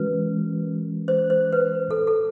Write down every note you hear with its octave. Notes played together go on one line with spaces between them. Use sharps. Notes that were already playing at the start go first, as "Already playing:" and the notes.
Already playing: E3 G#3 C#4 F#4 A#4 B4
C5
C5
B4
A4
A4